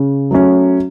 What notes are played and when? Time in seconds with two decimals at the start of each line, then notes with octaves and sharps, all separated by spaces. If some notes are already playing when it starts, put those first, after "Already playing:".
Already playing: C#3
0.31 F#3 A3 C#4